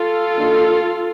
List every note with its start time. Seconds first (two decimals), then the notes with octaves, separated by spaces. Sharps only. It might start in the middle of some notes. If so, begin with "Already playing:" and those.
Already playing: F4 A4
0.37 D#3 A#3 D4